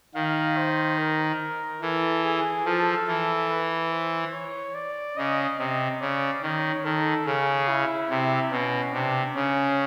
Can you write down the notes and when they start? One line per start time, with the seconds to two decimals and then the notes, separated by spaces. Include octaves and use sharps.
0.15 D#3 F5
0.57 C5
0.98 A#4
1.81 E3 A4
2.23 G#4
2.65 F3 A4
3.07 E3
3.50 B4
3.92 C5
4.33 C#5
4.74 D5
5.17 C#3 D#5
5.59 C3 D#5
6.00 C#3 D5
6.42 D#3 C#5
6.85 D#3 A4
7.25 C#3 G#4
7.68 E4
8.10 C3
8.52 B2 C#4
8.93 C3 D4
9.35 C#3 C#4